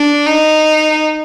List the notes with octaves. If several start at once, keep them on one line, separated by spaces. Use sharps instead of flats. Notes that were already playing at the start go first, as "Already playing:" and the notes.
Already playing: D4
D#4